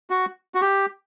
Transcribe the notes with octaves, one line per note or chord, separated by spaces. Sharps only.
F#4
F#4
G4